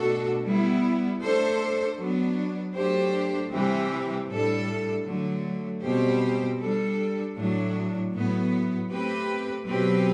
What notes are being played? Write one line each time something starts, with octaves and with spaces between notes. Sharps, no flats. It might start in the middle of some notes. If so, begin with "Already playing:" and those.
Already playing: B2 A3 D4 F#4 A4
G3 B3 E4
A3 D4 A4 C5
F#3 B3 D4
F#3 A3 D4 G4 C5
C3 E3 G3 C4 G4
A2 G3 D4 A4
D3 F#3 A3
B2 G3 C4 G4 C5
G3 D4 A4
A2 F#3 A3 D4
A2 F#3 B3
A3 C4 G4 B4
B2 F#3 C4 G4 B4